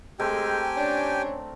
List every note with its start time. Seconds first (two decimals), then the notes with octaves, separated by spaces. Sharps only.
0.19 G#3 A3 C4 G4 A#4 G5 G#5
0.77 C#4 D4